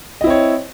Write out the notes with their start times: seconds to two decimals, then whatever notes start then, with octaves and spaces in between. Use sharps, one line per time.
0.21 D#5
0.24 E4
0.27 C4
0.30 C#5